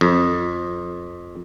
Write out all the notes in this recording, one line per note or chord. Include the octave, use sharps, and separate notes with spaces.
F2